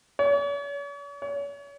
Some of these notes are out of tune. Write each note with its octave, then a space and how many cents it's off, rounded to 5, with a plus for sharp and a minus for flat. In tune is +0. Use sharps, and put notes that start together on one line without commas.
C#5 +45
C#5 +40